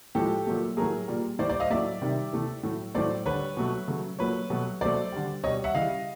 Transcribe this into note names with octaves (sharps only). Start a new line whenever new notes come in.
A2 F3 G#3 G4 A4
A#2 F#3 A3
A2 F#3 A3 G#4 A#4
A#2 G3
A2 E3 G3 C5 D5
C5 D5
D#5 F5
A2 F#3 A3 D5 E5
C3 D#3 G3
C3 E3 A3
A2 F#3 A3
A2 F#3 A3 C5 D5
D3 G3 B4 C#5
B2 F#3 A3
C#3 F#3 A3
A#2 F#3 A3 B4 C#5
B2 F#3 A3
B2 F#3 A3 C5 D5
D3 G3
B2 G3 C#5 D#5
E5 F#5
C#3 E3 G3 D#5 F5